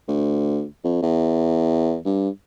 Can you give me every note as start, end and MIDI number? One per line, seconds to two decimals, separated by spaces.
0.08 0.65 38
0.84 1.01 41
1.02 1.97 40
2.05 2.29 43